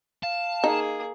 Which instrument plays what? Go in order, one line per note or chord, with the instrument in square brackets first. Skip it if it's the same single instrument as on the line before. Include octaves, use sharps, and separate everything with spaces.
[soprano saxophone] F5 [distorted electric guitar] A5
[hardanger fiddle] A#3 G#4 [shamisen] D#4